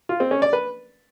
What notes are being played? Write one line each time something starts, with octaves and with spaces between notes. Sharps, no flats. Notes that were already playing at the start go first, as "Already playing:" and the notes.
F4
C4
C#4
D5
B4